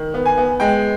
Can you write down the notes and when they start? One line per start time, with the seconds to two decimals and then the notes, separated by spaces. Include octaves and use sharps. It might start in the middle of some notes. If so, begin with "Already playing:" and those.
Already playing: D#3
0.14 B3
0.26 G#5
0.37 B3
0.60 G#3 G5